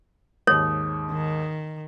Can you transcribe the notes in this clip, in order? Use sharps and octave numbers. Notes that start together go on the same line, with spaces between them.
D#2 G#2 C#5 D#6
D#3